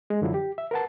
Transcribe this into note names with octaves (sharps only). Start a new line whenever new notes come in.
G#3
F#2 D3 F3 F#3 E4
G4
E5
A#4 B4 F#5 A5